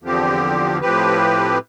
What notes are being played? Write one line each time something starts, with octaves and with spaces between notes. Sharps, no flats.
E2 D3 F3 C4 G4
A2 F3 C4 G4 B4